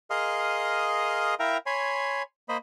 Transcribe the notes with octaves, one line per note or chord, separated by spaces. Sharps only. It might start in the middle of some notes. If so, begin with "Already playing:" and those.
G#4 A#4 D#5 F5 C6 D#6
E4 A#4 E5 F5 G5 A#5
C#5 G#5 B5 C6
A#3 C5 D#5 B5